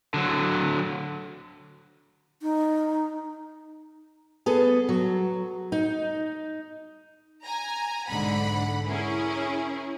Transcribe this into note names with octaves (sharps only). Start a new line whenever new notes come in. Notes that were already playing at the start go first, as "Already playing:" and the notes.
D3 F#3
D#4
B3 G#4 A4
F#3
D#4
G#5 A#5
B1 G#2 D3 F#5 B5
C#4 E4 G#4 A#4